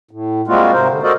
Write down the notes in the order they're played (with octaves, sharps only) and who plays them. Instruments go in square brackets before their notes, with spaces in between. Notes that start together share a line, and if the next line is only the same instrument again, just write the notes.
[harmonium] A2
G3 G#3 A#3 C4 F4 F#4
G#2 C3 A#4 C5
D3
F#4 A4 A#4 C5 D5 D#5